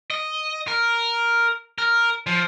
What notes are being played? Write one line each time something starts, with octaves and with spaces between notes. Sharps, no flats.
D#5
A#4
A#4
F3